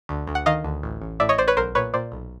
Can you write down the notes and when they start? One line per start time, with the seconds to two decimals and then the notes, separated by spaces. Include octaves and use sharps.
0.09 D2
0.27 D2
0.35 F#5
0.46 D#3 D#5 F5
0.64 D2
0.83 A1
1.02 A1
1.20 A2 D5 E5
1.29 C#5 D#5
1.38 A1 C5 D5
1.47 B4 C#5
1.57 B1 A#4 C5
1.75 A#2 B4 C#5
1.94 A#2 C5 D5
2.12 B1